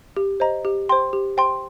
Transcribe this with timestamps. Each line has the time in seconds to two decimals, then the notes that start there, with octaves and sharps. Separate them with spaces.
0.17 G4
0.40 C5 D#5 A#5
0.65 G4
0.89 C5 G5 C6
1.13 G4
1.37 C5 G5 C6